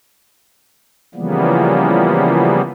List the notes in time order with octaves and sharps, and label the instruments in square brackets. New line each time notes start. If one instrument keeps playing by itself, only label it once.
[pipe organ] C#3 E3 F3 G3 A#3 B3